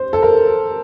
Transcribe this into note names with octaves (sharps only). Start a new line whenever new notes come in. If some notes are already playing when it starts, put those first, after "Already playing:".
Already playing: C5
A4
A#4